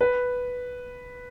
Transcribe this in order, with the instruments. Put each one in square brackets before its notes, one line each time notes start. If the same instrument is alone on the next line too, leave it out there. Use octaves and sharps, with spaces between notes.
[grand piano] B4